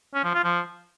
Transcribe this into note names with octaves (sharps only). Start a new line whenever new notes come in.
C#4
F3
F4
F3